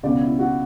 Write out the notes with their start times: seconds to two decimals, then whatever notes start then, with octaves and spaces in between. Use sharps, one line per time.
0.03 C#2 B2 D5
0.21 E4
0.39 F#4